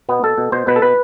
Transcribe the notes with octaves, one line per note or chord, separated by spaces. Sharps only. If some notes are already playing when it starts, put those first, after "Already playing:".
B2 B3
B2 A4
B2
B2 C5
B2 B4
A4
B2 B4